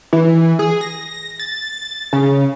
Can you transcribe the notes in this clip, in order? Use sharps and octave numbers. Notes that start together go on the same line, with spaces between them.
E3
G#4
A#6
A6
C#3